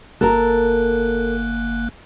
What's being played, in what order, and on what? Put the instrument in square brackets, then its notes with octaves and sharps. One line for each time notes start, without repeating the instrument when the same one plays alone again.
[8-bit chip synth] G1 A#3 F#6 [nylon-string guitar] A4 A#4